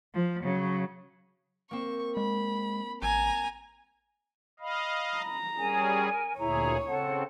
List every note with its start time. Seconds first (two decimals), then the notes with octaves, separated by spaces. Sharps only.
0.14 F3
0.44 C#3 F#3
1.71 A#3 C4 C#6
2.17 G#3 B5
3.02 A1 G#5 A#5
4.60 D#5 F5 B5
5.18 A#5
5.58 G3 C#4 G#4 A#4 G#5
6.39 D2 A#2 E4 G#4 C#5 A#5
6.87 C#3 C4 A4 F#5 A5